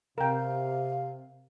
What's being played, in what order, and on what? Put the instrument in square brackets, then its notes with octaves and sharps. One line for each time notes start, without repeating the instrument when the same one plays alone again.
[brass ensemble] C3 [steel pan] A#4 G5 [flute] F5